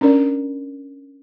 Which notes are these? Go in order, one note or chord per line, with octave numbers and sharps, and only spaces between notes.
C#4 D4 A#4 D5